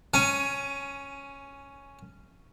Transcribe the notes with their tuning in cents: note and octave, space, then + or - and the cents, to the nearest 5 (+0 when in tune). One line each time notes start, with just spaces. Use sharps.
C#4 +0 G#5 +15